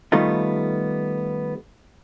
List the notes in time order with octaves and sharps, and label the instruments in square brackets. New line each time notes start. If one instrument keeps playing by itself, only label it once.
[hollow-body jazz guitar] D#3 G3 A3 B3 D#4 F4